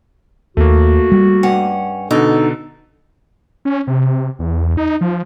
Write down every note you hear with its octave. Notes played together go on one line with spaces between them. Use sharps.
D#2 A3 A#3 F#4
G3
G2 C#4 F#5
B2 D3 D#4 A4
C#4
C3
E2
D#4
F3